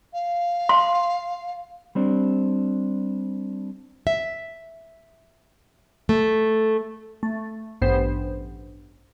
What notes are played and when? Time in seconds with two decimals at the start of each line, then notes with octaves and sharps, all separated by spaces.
0.14 F5
0.69 C6
1.95 G3 C4 D4
4.07 E5
6.09 A3
7.23 A3
7.82 A1 G2 B3 C5